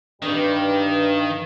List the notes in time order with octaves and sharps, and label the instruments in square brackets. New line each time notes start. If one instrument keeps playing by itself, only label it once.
[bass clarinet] G2 [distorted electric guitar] D#3 [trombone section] G3 [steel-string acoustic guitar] D4 B4